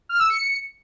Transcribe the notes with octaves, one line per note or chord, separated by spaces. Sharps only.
F6
E6
C#7